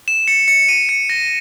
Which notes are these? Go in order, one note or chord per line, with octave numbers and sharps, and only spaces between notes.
E7
C#7
C#7
D#7
C#7
A#6